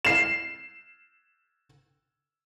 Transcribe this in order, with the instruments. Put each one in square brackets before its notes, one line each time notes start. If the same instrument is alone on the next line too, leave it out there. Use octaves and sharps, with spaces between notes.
[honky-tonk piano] C7 E7